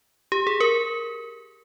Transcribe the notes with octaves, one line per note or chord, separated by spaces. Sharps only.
G4
G#4
A#4